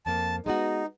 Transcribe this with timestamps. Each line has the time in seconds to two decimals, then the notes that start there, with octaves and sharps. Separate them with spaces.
0.06 F2 A#3 A5
0.46 G#3 B3 D#4 F#4